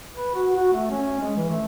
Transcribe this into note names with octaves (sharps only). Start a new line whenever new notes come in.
B4
F#4
F#4
A3
C#4
G#3
E3
A3